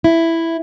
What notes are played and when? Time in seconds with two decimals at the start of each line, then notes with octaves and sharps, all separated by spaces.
0.04 E4